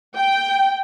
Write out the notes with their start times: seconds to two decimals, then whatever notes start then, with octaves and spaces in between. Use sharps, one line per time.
0.16 G5